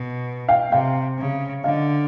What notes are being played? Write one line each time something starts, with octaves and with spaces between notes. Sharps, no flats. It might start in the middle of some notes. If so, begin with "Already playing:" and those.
Already playing: B2
F5 G5
C3 F5 G5
C#3
D3 D#5 F5